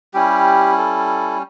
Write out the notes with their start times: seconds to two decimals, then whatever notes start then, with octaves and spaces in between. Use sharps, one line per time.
0.14 G3 C#4 E4 G4
0.78 A4